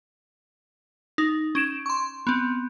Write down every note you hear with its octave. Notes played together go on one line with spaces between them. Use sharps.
D#4
C#4 D7 E7
C6 C#6
B3 C4